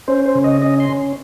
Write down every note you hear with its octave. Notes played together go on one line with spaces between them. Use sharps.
C#4 C5
C5
C#3
D#5
C#4 D#5
C6
C#4